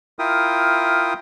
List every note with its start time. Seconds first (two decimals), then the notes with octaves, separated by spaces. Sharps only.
0.19 E4 F4 A#4 G5 D#6